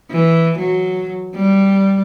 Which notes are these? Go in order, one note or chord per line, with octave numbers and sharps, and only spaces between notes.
E3
F#3
G3